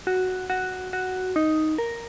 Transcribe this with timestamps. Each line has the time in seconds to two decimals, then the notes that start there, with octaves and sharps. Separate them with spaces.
0.07 F#4
0.50 F#4
0.93 F#4
1.36 D#4
1.78 A#4